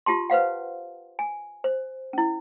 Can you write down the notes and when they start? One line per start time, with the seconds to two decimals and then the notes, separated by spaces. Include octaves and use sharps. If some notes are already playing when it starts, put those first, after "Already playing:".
0.06 F4 G4 A5 C6
0.30 B4 C5 F5 F#5
1.19 G#5
1.64 C5
2.13 C#4 E4